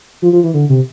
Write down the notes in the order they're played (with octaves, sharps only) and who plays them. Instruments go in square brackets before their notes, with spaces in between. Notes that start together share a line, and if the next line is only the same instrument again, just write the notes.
[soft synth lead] F3
F3
E3
D3
C3